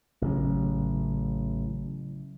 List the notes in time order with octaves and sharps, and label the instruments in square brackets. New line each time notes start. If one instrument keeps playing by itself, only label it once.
[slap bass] A1 [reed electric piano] C#3 F#3 C#4